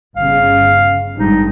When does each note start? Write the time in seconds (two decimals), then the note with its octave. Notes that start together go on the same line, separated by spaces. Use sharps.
0.16 G1 C#3 F5
1.17 G#1 G2 D#4